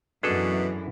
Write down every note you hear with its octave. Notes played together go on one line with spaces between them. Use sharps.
F#2 B2 E3 D4 G#4 A4